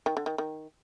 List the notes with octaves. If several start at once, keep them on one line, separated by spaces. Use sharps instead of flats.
D#3
D3
D#3
D#3